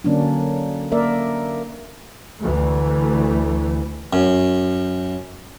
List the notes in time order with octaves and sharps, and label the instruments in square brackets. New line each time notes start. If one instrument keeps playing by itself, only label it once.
[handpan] D3 F#3 A#3 C#4 D4
A#3 A#4 D5 E5
[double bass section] D2 E3 A3
[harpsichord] F#2